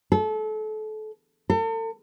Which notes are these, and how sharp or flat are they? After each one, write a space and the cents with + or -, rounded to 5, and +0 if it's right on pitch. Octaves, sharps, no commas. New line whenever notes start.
A4 -30
A4 +40